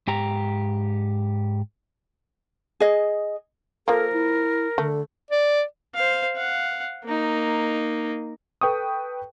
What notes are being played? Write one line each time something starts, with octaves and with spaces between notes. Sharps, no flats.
G#2 G4 A#5
G#4 D#5
F3 A#3 A4 A#4
E4
D3 A3
D5
C5 F5
F5 F#5
A#3 D#4
A4 B4 G5 C#6 D#6